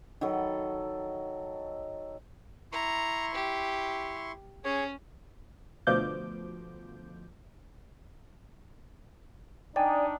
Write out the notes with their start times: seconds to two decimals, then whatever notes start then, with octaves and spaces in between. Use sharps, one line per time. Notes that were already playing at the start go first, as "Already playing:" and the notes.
0.21 D#3 F#3 A4 B5
2.72 E4 A#5 C6 C#6
3.34 G4
4.64 C#4 G#4 C#5
5.87 D2 B2 F3 D6 G6
9.76 D4 D#4 D5 G5 G#5